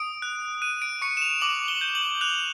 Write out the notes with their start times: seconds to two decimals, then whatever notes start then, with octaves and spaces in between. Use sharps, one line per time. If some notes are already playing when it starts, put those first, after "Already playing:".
Already playing: D#6 D7
0.22 F#6
0.62 F#6 D#7
0.82 D7
1.02 C#6 C#7
1.17 E7
1.22 F7
1.41 D6 F#7
1.68 G7
1.81 G6
1.95 F#7
2.21 F#6 F7